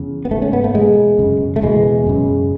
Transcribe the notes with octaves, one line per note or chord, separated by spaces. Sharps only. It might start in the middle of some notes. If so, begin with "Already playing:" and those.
Already playing: E2 C#3
B3
G#2 A3
C#4
B3
A3
E2 B2 G#3
F#2 C#3
A3
E2 B2 G#3
F#2 C#3